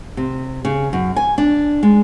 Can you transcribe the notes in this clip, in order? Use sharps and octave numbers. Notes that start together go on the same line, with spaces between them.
C3
C#3
F#2
G#5
D4
G#3